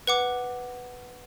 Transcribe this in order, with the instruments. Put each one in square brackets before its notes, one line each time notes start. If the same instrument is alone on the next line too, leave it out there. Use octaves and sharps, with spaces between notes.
[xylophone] B4 F#5 D6